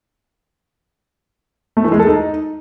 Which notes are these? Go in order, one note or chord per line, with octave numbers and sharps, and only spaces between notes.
A3
E3
G#3
A4
D#4